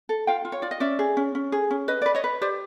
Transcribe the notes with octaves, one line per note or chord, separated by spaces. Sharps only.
A4
F4 F5 G5
F4
C#5
F4 D5
D#5
C#4 D5 E5
G#4
C#4
C#4
G#4
C#4
B4 D#5
B4 D5
C#5 D#5
B4
G4 C5 D5